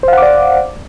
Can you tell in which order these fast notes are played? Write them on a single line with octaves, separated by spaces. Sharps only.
C5 F5 F#5 D6 D5